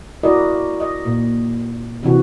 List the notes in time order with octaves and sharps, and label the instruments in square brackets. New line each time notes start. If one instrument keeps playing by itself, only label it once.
[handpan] E4 F#4 A#4 D5 D#5
D#5
A#2
C3 E3 F#4